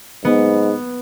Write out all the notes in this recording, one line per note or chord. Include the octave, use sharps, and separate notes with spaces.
G#2 B3